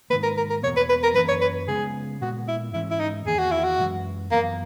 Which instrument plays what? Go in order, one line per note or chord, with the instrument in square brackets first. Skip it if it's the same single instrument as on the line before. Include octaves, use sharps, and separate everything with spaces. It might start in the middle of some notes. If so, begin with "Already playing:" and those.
[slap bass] G#2 D#3 A#3 [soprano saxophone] B4
[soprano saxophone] A#4
A#4
A#4
[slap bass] E2 B2 A#3 [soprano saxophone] C#5
[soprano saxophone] B4
B4
A#4
[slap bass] F#2 E3 A#3 C#4 [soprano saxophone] B4
[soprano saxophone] C#5
B4
[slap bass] C#3 G#3 B3 [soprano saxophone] G#4
[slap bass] A#2 G#3 B3 [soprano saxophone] F#4
[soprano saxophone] E4
[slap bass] G#2 E3 G#3 C#4 [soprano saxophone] E4
[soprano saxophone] E4
D#4
[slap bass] E2 D#3 A#3 [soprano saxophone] G#4
[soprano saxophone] F#4
E4
F#4
[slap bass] F#2 E3 G#3
[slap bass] F#2 E3 B3 [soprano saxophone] A#3